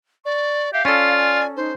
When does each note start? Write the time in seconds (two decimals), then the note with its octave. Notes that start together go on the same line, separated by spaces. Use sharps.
0.25 D5 C#6
0.73 G4 E5 F5
0.85 C#4 F4 A4 D5
1.16 G#5
1.56 D#4 C5